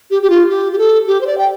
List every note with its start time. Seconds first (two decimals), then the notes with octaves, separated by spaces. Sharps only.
0.11 G4
0.23 G4
0.30 F4
0.50 G4
0.72 G4
0.78 A4
1.07 G4
1.21 C5
1.27 D5
1.38 G5